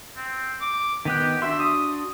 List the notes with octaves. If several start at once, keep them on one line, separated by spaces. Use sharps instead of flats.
C4
D6
D#3 B3 G4 F#6
D4 F#4 E5 C6
D#6